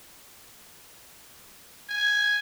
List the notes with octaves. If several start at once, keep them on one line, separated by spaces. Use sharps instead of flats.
G#5